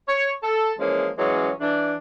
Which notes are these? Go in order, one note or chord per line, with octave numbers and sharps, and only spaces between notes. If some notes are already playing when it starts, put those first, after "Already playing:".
C#5
A4
E3 F3 G#3 A#3 C#4
E3 F#3 G#3 C#4
E3 D4